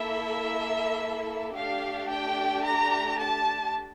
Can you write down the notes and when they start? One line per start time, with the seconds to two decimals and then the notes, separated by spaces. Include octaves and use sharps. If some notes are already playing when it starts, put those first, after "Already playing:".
Already playing: A#3 E4 A4 E5
1.56 A3 D4 G4 F5
2.12 G5
2.65 A#5
3.20 A5